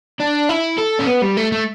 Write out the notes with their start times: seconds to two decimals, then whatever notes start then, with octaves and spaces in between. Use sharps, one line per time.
0.20 D4
0.49 E4
0.78 A4
0.99 C#4
1.07 B3
1.22 G3
1.37 A3
1.52 A3